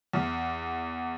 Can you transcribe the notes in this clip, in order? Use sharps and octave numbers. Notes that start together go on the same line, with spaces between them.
E2